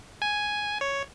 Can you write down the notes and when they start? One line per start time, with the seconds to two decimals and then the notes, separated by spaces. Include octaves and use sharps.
0.22 G#5
0.81 C#5